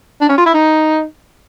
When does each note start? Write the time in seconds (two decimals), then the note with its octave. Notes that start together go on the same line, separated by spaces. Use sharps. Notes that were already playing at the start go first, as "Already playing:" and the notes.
0.21 D4
0.29 C#4
0.38 F4
0.46 E4
0.54 D#4